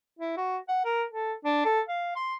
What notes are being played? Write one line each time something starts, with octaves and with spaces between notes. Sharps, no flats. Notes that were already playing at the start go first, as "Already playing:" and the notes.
E4
F#4
F#5
A#4
A4
D4
A4
F5
C6